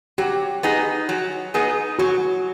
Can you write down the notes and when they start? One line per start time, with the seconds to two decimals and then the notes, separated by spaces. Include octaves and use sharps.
0.18 F#3 G4
0.63 B3 D#4 G#4
1.09 F#3
1.54 B3 D#4 G#4
1.99 F#3 F#4